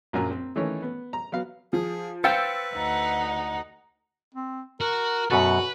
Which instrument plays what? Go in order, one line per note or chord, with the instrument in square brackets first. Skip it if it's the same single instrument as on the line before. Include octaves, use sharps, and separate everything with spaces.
[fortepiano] A#1 F#2 A#3 F#4 G#5 A#5
C4
D#3 E3 A3 C#4 C#5
B3
A#5
F#3 B3 F5
[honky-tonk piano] F3 [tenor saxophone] G#4
[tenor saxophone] B4 [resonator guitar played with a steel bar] C5 F5 G5 [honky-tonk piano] E6 A6 C#7
[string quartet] D2 D#4 F#5
[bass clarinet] C4
[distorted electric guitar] F#4 [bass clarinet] A#4
[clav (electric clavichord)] F#2 B2 A4 [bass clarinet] F#4 [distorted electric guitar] B4